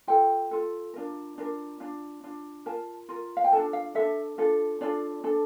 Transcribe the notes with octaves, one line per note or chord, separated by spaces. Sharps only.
F4 A4 G5
F4 A4
D4 F4 A#4
D4 F4 A#4
D4 F4
D4 F4
F4 A#4 A5
F4 A#4
F5
G5
D4 F4 A4 A5
F5
D4 F4 A4 E5
D4 F4 A4
D4 F4 A4 D5
D4 A4